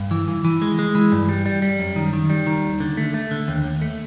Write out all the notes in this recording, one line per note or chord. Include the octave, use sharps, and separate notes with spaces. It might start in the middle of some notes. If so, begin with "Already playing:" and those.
Already playing: G2
E3
E3
E3
G#3
G#3
E3
G2
G3
G3
G3
F#2
D#3
D#3
G3
D#3
D#2
D3
A3
A3
D3
D#2
D#2
A3